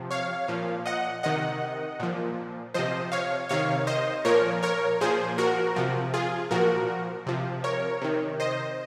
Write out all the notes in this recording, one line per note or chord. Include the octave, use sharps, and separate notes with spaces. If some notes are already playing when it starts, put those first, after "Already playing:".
Already playing: C3 F3
C#5 F5
A#2 F3
D#5 F#5
C3 D#3 D#5 F#5
A#2 F3
C3 F3 C5 D#5
C#5 F5
C3 D#3 C#5 F5
C5 D#5
A#2 F3 A#4 C#5
A#4 C#5
A#2 F3 G#4 C5
F#4 A#4
C3 F3
F4 G#4
A#2 F3 F#4 A#4
C3 F3
A#4 C#5
C3 D#3
C5 D#5